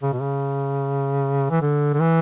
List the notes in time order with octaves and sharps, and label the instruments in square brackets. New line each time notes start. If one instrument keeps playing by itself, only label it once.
[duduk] C#3
B2
C#3
E3
D3
D3
E3